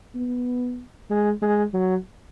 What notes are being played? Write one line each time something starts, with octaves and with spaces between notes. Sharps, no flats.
B3
G#3
G#3
F#3